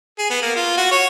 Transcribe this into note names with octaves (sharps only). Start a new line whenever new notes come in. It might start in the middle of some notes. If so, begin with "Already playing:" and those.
G#4
B3
A#3
F4
F#4
C#5